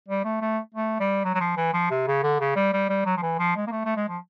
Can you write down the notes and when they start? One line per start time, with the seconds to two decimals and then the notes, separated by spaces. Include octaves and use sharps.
0.08 G3
0.24 A3
0.41 A3
0.75 A3
1.00 G3
1.24 F#3
1.35 F#3
1.41 F3
1.57 E3
1.73 F3
1.90 C3
2.07 C#3
2.23 D3
2.40 C#3
2.56 G3
2.73 G3
2.89 G3
3.06 F#3
3.17 F3
3.22 E3
3.39 F3
3.56 G#3
3.67 A#3
3.71 A3
3.85 A3
3.96 G#3
4.09 F3